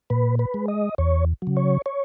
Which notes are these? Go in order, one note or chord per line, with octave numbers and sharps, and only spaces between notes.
A#2 B4
B4
G#3
D#5
E2 C#5
C#3 F#3
C#5
C#5